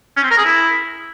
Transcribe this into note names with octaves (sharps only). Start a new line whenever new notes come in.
C#4
C4
A#4
G#4
E4